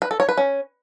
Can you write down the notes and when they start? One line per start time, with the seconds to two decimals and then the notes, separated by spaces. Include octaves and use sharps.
0.02 B4
0.11 A4
0.20 C#5
0.29 B4
0.37 C#4